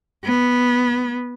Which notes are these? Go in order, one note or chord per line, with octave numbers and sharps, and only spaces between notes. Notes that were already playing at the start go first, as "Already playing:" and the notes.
B3